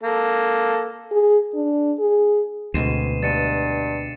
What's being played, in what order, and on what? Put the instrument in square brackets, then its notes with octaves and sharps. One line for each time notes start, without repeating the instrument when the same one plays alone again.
[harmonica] A#3 A4
[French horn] G#4
D4
G#4
[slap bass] D2 [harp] B2 G#3 C4 [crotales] C7 D#7 E7
[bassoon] G2 [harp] G#3 D4 [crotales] A6 C#7 D#7